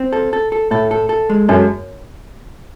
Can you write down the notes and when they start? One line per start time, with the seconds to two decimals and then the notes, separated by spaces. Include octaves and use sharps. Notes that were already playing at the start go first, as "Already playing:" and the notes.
Already playing: C4
0.13 A4
0.33 A4
0.52 A4
0.71 A2 A4
0.91 A4
1.09 A4
1.30 G#3
1.49 F#2 A4